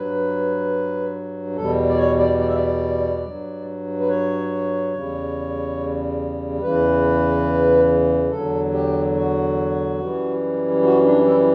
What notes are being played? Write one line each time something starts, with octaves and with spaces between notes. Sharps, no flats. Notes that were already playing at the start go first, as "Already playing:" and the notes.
Already playing: G2 F#3 B4
E2 B2 G3 A4
D5
C#5
D5
D5
E5
D5
G2 F#3
B4
C#5
E2 C#3 G3
E2 C#3 E3 B4
E2 D3 F#3 A4
G4
F#4
F#2 E3 G3
F#4
D4
E4